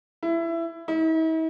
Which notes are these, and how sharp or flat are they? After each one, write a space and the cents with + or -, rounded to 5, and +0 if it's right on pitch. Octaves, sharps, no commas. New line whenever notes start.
E4 +20
E4 -45